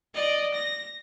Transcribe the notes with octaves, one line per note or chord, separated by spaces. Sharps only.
D5 D#5
A#6